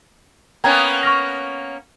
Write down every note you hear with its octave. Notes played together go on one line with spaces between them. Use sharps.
A#3 B3 C#4 G5 A#5 G#6
C#6 F6 A#6